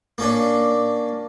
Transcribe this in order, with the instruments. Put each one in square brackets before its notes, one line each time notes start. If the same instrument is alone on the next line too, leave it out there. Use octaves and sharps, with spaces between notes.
[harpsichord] A#3 C#4 D4